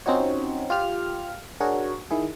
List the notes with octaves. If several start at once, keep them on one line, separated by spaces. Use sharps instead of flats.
C4 C#4 D#4 F4 F#4 C#5
F4 G4 F6
D4 F#4 G#4 A#4 C#5
D#3 E4 G#4